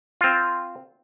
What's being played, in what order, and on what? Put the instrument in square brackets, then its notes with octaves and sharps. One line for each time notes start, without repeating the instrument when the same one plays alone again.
[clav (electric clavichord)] C4 F4